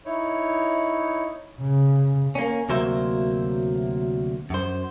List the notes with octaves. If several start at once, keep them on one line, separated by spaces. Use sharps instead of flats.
D#4 E4 C#5
C#3
A#3 C#4
D2 C3 F#3 A#3 C5 E5
F#2 C5